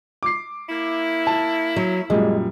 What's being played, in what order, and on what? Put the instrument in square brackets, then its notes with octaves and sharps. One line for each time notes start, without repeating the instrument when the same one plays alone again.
[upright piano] D6 C7
[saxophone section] A#3 E4
[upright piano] A5
[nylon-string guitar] F#3
[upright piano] F#2 A#2 G3 [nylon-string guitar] G#3